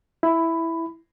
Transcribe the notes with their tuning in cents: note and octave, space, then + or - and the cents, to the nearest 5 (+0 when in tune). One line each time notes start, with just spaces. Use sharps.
E4 +0 B5 +10